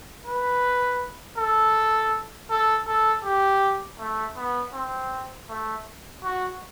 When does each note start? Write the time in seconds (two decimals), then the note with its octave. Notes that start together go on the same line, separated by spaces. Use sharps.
0.26 B4
1.38 A4
2.50 A4
2.87 A4
3.25 G4
3.99 A3
4.37 B3
4.74 C4
5.49 A3
6.24 F#4